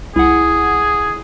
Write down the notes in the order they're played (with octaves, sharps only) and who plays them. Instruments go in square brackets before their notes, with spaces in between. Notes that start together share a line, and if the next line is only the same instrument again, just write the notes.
[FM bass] C2 [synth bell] E4 F#5 [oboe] G#4